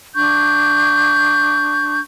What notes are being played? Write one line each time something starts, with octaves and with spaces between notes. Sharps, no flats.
D4 C#6 G6